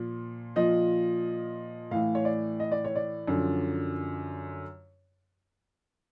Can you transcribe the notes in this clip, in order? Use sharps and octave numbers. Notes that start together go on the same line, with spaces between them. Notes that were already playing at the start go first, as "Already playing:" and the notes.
Already playing: A#2 F3
A#2 F3 D#5
A2 E3 F5
C#5
D5
D#5
D5
C#5
D5
F#2 D3 F3